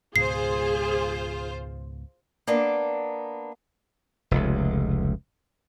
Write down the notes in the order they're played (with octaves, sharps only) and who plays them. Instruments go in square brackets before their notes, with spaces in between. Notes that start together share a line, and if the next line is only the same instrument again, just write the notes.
[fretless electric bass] C#2 G#2 B2 [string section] F4 C5 [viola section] G#4 [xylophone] C7
[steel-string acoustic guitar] A#3 B3 D4
[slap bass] F1 C#2